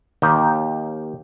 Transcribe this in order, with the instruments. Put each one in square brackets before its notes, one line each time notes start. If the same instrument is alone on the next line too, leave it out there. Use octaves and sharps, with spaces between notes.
[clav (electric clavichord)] D#2 D#3 G4 G5